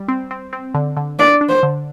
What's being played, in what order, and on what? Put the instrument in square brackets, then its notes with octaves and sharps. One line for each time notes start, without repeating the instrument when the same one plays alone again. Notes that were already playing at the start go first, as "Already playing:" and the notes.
Already playing: [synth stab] G3
C4
C4
C4
D3
D3
[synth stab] D4 [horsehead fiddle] D5
[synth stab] D4
[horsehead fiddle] C5
[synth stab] D3